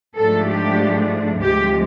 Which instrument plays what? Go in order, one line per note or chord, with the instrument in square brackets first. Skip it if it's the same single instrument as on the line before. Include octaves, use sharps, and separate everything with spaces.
[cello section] G#2 F3 A3 D4 A4
G4
D2 C3 F3 G#3 G4